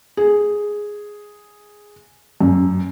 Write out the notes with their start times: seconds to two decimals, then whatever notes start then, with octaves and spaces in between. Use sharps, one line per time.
0.17 G#4
2.41 F#2